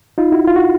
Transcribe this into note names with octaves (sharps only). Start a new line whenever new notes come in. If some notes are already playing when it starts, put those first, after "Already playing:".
D#4 F4
E4 F#4
F4
F#4